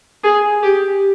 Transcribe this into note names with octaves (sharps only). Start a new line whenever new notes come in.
G#4
G4